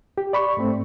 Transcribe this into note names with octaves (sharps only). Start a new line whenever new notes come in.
G4
D5 B5 C#6
G#2 A3 C4